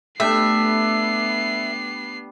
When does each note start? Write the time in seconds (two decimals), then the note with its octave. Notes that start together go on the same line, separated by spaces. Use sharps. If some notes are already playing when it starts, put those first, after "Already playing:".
0.20 G3 A3 B3 D4 E5 C7